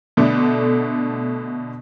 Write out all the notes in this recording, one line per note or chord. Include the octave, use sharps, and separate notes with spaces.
B2 D3 A3